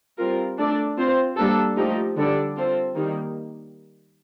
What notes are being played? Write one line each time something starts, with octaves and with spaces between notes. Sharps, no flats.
G3 C4 F4 A#4
A3 D4 A4 D5
C4 F4 C5
G3 A#3 D4 A4
F3 A3 D#4 G4
D3 G3 D4 A4 D5
C4 F4 A4 C5
D#3 G3 A#3 D#4